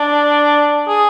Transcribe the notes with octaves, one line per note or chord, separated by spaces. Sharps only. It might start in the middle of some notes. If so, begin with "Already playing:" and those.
Already playing: D4
G#4